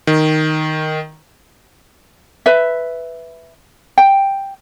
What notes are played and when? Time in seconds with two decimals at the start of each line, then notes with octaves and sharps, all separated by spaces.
0.07 D#3
2.46 B4 E5
3.98 G5